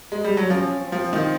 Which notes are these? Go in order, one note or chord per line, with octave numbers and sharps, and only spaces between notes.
G#3
G3
F#3
F3 C#4
C4
F3
D#3